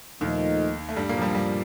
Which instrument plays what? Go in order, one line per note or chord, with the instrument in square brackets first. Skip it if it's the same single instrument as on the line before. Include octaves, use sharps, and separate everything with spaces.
[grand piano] D#2 D#3 [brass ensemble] A#2 F3 A3 D#4
[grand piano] A3
G2 G3
A#2 A#3
F3
G2 G3
G2 G3